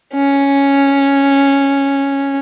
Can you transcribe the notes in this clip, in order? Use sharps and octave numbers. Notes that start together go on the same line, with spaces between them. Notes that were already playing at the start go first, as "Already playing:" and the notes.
C#4